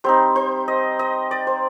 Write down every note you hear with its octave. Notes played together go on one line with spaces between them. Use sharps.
G3 C4 D#4 C5
C5
D#5
D#5
D5
C5